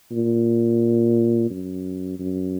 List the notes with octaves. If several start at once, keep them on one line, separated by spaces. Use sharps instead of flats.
A#2
F#2
F#2